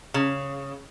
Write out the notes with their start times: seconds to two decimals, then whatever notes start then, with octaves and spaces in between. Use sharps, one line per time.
0.14 C#3